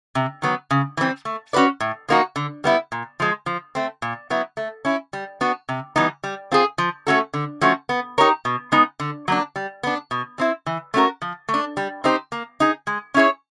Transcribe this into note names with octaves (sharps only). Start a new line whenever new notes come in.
C3
D#3 F#3 B3
C#3
E3 G3 C4
A3
C#4 F#4 B4 D5
A2
F3 A#3 D#4 F#4
D3
G3 B3 E4
A#2
F3 G#3
F3
A3 C4
A#2
F#3 B3 E4
A3
C#4 E4
G3
B3 D4 F#4
C3
E3 G3 B3 D#4
G3
C4 F4 G#4
F3
A3 C#4 F#4 A4
D3
F3 A3 C#4 F#4
B3
D#4 G4 A#4 C#5
B2
G#3 B3 D#4
D3
F#3 A#3 D4
G3
B3 D4
B2
G3 C4 E4
E3
A3 C#4 F#4 A#4
F3
A3
D4
G3
C4 D#4 G4 C5
A#3
D#4 G#4
G#3
C#4 E4 G#4 C#5